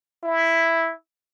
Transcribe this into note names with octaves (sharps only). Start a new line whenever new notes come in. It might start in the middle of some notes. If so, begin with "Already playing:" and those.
E4